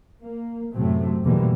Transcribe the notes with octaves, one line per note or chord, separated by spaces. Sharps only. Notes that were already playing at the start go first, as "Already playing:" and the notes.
A#3
F#2 A2 C3 F#3 A3 C4
E2 B2 D3 E3 G3 A#3